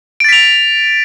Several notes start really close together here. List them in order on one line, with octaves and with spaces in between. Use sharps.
D7 A6 B6 F7